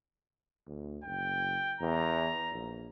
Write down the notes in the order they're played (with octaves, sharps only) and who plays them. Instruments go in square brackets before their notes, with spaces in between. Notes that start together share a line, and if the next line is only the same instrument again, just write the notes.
[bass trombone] D2
[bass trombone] F#1 [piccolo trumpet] G5
[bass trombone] E2 [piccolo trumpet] A#5
[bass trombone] A#1